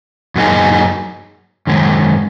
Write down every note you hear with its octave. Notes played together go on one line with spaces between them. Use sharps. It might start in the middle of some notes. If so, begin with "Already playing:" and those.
F#2 F#3 A#3 D#4 G#4
F#2 D#3 G#3